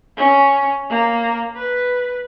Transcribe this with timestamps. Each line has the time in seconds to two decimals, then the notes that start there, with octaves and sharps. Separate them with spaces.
0.17 C#4
0.90 A#3
1.55 B4